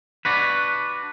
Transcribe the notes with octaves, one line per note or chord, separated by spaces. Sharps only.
D4 F#4 B4